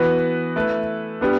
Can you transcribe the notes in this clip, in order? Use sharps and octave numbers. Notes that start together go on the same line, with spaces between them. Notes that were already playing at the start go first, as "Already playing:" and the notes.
Already playing: E3 B3 F#4 B4
A3 E4 B4
G3 B3 D4